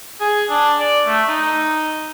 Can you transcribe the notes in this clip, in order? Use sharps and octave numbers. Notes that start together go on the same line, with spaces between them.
G#4
D4
D5
A3
D#4